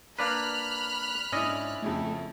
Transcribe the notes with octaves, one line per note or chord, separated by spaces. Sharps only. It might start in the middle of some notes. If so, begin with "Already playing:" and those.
A#3 D4 B4 B5 F6 F#6
G#2 C#4 D4 E4 D#5
F2 C#3 A3 E4